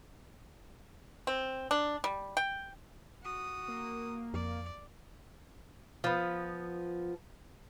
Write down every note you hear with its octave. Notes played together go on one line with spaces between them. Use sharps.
C4
D4
G3
G5
F#4 D#6
A#3
F2 D5
F3 B3